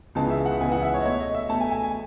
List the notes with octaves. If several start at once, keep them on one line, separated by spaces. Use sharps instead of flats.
C#2 C#3 E3 B3 A5
E5
F#5
C#2 C#3 E3 B3 G#5
F#5
E5
C#5
D#5
B2 A3 C#5
D#5
E5
B2 A3 A5
G#5
G#5
G#5